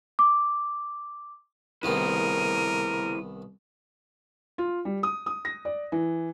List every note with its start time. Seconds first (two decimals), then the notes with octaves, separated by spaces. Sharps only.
0.19 D6
1.83 C2 D#3 B3 E4 G#4 A#4 C5 D#7
4.58 F4
4.85 G3
5.03 D#6
5.26 D#6
5.45 A#6
5.65 D5
5.92 E3